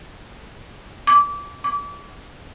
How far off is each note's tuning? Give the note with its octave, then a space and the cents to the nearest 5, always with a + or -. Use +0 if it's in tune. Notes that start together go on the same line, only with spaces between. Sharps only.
D6 -25
D6 -35